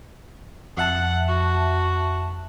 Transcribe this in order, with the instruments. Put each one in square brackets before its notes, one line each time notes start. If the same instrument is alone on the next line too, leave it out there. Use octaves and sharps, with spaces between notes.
[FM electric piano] F2 E5 A5 [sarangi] F#5
[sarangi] F#4